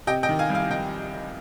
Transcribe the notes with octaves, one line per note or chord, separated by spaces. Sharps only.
C3 D#5 G5
D#5 G5
D#3
F5 G#5
C2
F5 G#5
D#3 D#5 G5